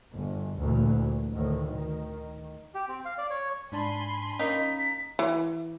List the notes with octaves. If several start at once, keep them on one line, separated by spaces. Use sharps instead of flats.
G1
D2 A#2 E3
D2 A2 D#3
D#3
G4
C4
F5
D5
C#5
G#2 D4 G#5 A5 B5 C6
A#3 C#4 D#4 B6
E3